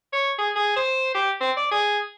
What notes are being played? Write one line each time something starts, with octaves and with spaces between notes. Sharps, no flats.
C#5
G#4
G#4
C5
G4
C4
D5
G#4